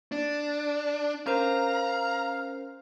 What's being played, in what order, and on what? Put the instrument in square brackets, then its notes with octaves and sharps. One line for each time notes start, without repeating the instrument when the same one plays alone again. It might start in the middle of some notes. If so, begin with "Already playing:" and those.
[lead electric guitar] D4
[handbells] C#4 A#4 C5 [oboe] F5 [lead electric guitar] A#5